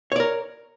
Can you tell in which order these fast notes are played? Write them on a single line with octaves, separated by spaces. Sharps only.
C#5 D5 A#4